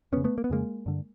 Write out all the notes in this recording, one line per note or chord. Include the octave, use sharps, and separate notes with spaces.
F2 C#3 B3 C#4
A3 B3
A#3
B3
F2 C#3 G#3 A#3
G2 D3